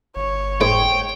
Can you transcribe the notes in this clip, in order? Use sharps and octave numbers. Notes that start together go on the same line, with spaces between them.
G1 C#5
G#2 G5